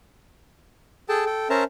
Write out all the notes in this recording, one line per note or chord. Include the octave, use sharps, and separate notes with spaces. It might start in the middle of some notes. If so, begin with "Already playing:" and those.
G#4 A4 G5 A5
A4 G5
C#4 A#4 C5 E5 A5 A#5